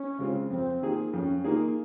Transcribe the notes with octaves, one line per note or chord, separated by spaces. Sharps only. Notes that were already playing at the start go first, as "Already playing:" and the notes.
Already playing: C#4
C#3 G#3 C4 F4
F2 C4
D#3 A#3 F4 G#4
F2 C#4
D#3 A#3 D#4 F4 G#4